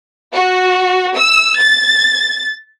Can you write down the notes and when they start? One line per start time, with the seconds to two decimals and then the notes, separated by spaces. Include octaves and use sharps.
0.34 F#4
1.17 E6
1.60 A6